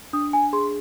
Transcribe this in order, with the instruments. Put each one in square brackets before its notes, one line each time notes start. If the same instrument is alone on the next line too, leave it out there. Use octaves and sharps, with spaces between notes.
[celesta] D4 D#6
G#5
G#4 C6